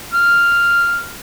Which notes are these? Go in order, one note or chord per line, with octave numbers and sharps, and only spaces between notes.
F6